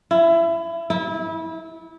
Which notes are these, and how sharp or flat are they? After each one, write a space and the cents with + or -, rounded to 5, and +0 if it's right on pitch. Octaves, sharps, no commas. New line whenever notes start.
E4 +25
E4 -25